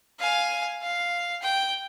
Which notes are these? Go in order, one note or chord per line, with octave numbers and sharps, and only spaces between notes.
F5 G#5
F5
G5